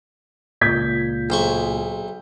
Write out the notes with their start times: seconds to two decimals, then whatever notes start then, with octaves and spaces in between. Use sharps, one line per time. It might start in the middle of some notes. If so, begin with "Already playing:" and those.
0.61 C#2 A#2 G6 G#6 B6
1.30 B1 G#4 C5 C#6